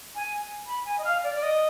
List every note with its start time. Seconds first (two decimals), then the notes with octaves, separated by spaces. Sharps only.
0.16 G#5
0.66 B5
0.85 G#5
0.98 D#5
1.04 F5
1.23 D5
1.35 D5
1.43 D#5